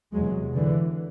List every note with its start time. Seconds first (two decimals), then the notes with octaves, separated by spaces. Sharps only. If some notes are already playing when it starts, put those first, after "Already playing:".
0.13 E2 C3 F#3 G#3
0.55 D3 E3